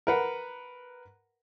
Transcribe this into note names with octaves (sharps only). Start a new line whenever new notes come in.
A#4 B4 F#5